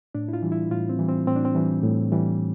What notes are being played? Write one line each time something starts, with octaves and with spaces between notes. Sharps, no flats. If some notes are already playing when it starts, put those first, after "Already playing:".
A2 D4
E4
F4
E3 G3
E4
A2 F4
C4
E3 G3
C4
A2 C4
D4
C4
E3 G3
A2
E3 G3